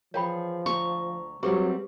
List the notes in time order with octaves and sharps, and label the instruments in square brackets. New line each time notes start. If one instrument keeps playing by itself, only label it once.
[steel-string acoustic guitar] E3 G#4 [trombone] F3 [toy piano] C#5 G5 B5
[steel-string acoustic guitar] D2 A#5 [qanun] C#6
[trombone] F#3 [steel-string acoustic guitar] G3 A3 C4 [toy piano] G4 G#4 B4